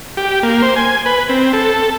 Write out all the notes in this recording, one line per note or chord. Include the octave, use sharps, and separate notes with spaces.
G4
A#3
C5
G#5
B4
C4
A4